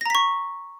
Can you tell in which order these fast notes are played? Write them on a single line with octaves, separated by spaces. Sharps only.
A#6 A#5 B6 C#6